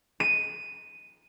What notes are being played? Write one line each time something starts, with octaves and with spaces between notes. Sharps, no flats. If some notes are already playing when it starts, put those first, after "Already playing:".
D#7